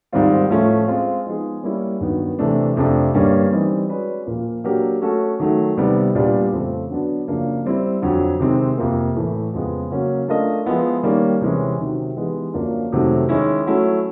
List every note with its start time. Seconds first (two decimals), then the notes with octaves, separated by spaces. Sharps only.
0.12 G#2 D#3 G3 C4 F4
0.50 A2 F3 A3 C#4
0.88 G#3 C4 F4
1.26 F3 G#3 B3 D#4 G#4
1.63 G3 A#3 C#4 E4
2.00 G2 D#3 F#3 B3
2.39 C3 E3 A3 D4
2.76 F2 C3 F3 A3 D4
3.14 G2 D3 G3 A#3 C#4
3.51 E3 G3 C4 D#4
3.88 G#3 C#4 F#4 B4 D5
4.26 A#2 F3 A#3
4.64 F#3 A#3 D4 G4 A#4
5.01 A3 C#4 F#4 A4
5.40 D#3 F#3 A3
5.77 C3 D#3 G3 B3
6.15 A#2 G3 B3 D4 G4
6.52 F2 C#3 F3 A3 C4
6.90 D3 F#3 B3 D4
7.28 F#2 C#3 F3 A#3 D4
7.65 G3 C4 E4
8.02 F2 D3 F#3
8.39 C3 D#3 G#3 C4
8.78 F2 C3 F3 A#3
9.15 A2 E3 A3
9.53 F2 C#3 F3 G#3 B3
9.90 C#3 F#3 A#3 C#4
10.28 A3 D4 F4 A#4 D#5
10.66 F3 G#3 B3 E4
11.03 D#3 G3 A#3 C#4
11.41 C3 E3 G#3 C#4
11.79 C3 D#3 F#3
12.16 E3 G#3 B3 D#4 G4
12.54 F#2 D3 F3 A#3 D4
12.92 F2 C3 D#3 F#3 A3
13.29 D#3 G#3 C#4 E4
13.67 F#3 A3 C#4 E4